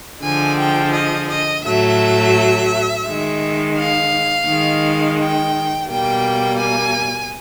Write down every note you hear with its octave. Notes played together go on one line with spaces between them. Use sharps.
D3 F3 G#3 G#5
G5
D#5
D#5
A2 F#3 A3 E5
D#3 G#3
F5
D#3 G#3
G5
B2 G3 A#3 G5
G#5